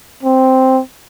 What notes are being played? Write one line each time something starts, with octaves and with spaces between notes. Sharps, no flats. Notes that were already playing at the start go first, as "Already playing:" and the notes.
C4